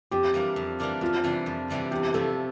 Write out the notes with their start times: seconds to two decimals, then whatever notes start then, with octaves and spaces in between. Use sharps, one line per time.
0.11 F2 G4
0.34 E3 G3 A#3 D4
0.56 F2
0.80 E3 G3 A#3 D4
1.01 F2 F4
1.24 C3 E3 G3 D4
1.46 F2
1.70 C3 E3 G3 D4
1.91 E2 G4
2.14 C3 F3 A3 E4 A4